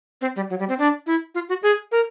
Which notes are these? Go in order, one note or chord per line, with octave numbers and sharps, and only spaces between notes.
C4
G3
F#3
G3
C4
D4
E4
F4
F#4
G#4
A#4